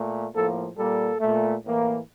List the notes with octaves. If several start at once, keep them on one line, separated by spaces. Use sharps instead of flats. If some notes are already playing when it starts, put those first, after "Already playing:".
Already playing: A#2 A3
A2 F3 A#3 A4
A#2 G3 A#3 A4
A#2 A3
A2 E3 A#3